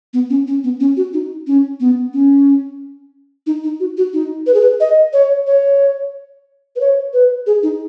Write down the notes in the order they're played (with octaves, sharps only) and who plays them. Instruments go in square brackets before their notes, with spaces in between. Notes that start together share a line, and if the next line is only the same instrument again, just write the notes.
[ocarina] B3
C#4
C#4
B3
C#4
F#4
D#4
C#4
B3
C#4
D#4
D#4
F#4
F#4
D#4
B4
G#4
B4
D#5
C#5
C#5
B4
C#5
B4
G#4
D#4